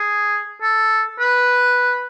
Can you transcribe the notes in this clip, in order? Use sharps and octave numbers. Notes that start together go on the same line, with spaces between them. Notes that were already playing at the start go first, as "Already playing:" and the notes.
Already playing: G#4
A4
B4